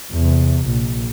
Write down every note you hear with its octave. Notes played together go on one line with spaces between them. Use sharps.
E2 C3
A#1